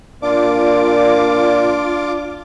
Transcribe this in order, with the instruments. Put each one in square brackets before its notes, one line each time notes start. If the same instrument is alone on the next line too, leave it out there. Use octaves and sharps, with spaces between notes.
[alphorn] A#2 [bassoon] D4 [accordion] F4 D6